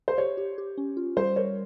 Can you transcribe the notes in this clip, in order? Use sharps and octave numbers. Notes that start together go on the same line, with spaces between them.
C5
G4 C#5
G4
G4
C#4
F4
G3 C5
A#4 C#5